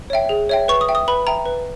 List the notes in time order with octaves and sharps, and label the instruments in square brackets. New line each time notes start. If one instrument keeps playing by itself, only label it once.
[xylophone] C#5 E5 G5
G#4
C#5 E5 G5
B4 C#6
D#6
E5 G5
D#6
B4 B5
E5 G5 A#5
B4